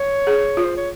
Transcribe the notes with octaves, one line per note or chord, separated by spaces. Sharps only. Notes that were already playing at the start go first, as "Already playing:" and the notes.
Already playing: C#5
G#4
F4
C5
C#5